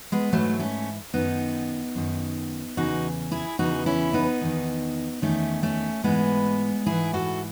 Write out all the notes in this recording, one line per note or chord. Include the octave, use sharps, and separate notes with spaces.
G#3 B3
G#2 E3 F#3 A3
A3 C#4
F#2 D#3 B3 D#4
F#2 D#3
E2 C#3 E3 D#4 F#4
E4 G#4
E2 C#3 E3 D#4 F#4
C#4 E4
B3 D#4
E2 D#3
E2 D#3 A3 C#4
A3 C#4
G#2 E3 G#3 B3
G#2 E3 E4 G#4
F#4 A4